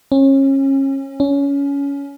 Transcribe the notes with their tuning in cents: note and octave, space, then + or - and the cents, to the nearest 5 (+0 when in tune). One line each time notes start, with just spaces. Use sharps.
C#4 -30
C#4 +20